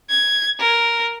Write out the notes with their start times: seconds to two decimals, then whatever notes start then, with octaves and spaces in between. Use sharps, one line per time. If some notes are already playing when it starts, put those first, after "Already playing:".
0.10 G#6
0.60 A#4